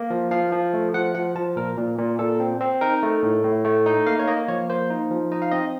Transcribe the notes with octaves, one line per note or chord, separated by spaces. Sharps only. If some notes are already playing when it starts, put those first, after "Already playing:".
Already playing: A#3
F3
F3 F5
F3
A3
F3 F#5
F3 F#5
F3 A5
A#2 A#4
A#2
A#2
A#2 A4
C4
C4
D#4 A#4
A3
A2
A2
A3
D#4
A#3 F5
C#5
A#3 D#5
F3 C#5
A#3 C5
D#4
F3
D#4 D#5
F5
C4 D#5